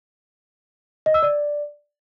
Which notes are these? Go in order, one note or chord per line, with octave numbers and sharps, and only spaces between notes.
D#5
E6
D5